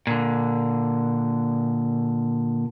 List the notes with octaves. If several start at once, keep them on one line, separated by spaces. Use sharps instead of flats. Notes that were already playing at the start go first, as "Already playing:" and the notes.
A#2 D3